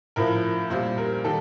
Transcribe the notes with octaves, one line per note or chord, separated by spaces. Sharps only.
A2 F3 A#4
A#2 G3 C5
A#4
D#3 G3 A4